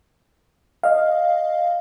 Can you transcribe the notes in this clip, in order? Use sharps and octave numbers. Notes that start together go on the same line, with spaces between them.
D#5 F5